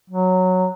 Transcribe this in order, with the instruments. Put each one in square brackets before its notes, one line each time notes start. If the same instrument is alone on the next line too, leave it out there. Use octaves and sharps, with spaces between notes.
[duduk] F#3